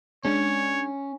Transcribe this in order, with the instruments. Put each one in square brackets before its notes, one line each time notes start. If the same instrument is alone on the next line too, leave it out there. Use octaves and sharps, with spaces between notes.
[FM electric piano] G#3 D4 [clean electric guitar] C#4 [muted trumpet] C#5